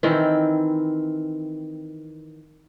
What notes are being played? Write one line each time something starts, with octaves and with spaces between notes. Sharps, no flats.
D#3 E3 C4 E4